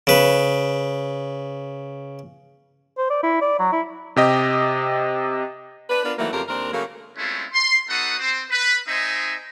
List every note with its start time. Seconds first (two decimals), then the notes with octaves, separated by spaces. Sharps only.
0.07 C#3 B4
2.98 C5
3.10 D5
3.23 E4
3.42 D5
3.59 F#3
3.73 E4
4.16 C3 G4 D#5
5.90 D4 B4
6.04 B3 D4 F4 A#4 B4
6.19 D#3 E3 F#3 A3 A#3
6.32 F2 C#3 A#3 G4 A#4
6.49 D#2 C4 D4 A#4
6.73 C#3 F#3 A3 A#3
7.17 G#3 A3 C4 C#4 E4 F4
7.53 C6
7.88 B3 D#4 F#4 A4 F#5 D#6
8.18 C4 C5
8.50 B4
8.87 C4 D#4 C5 D#5 E5 G#5